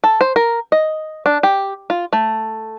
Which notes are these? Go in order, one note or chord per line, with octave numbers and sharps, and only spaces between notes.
A4
C5
A#4
D#5
D4
G4
F4
A3